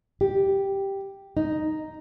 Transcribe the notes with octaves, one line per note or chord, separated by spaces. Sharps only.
G4
D#4